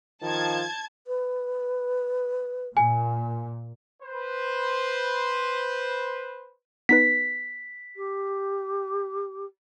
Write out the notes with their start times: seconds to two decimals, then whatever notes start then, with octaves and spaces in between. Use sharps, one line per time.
0.22 D#3 F3 F4 A5 G#6
1.07 B4
2.77 A#2 G#5
4.03 B4 C5
6.89 B3 D#4 B4 B6
7.96 G4